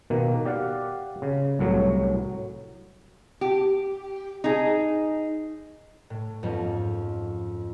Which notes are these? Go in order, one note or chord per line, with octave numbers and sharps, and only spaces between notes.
B2 D#3 A#3
G4 D5 F5 F#5
C#3
C2 A2 F#3
G4
D#4 G#4
A2
F2 G#2 B3 C#4